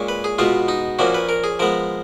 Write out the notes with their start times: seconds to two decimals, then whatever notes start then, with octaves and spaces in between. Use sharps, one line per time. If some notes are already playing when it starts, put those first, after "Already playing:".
Already playing: A#2 G#3 C#4
0.09 B4
0.24 G#4
0.38 B2 G#3 B3 F4
0.68 D#4
0.99 A#2 F3 A#3 C#4 F#4
1.15 B4
1.29 A#4
1.44 G#4
1.59 F3 G#3 B3 A#4